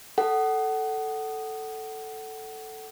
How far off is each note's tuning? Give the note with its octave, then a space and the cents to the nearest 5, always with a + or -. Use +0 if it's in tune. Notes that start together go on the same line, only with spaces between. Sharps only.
A4 +0 F#5 +25